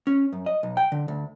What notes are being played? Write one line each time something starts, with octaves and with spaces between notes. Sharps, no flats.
C#4
F#2
D#5
B1
G5
D3
D2